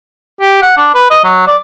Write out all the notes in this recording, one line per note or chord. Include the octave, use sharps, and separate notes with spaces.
G4
F#5
D4
B4
D#5
F#3
D5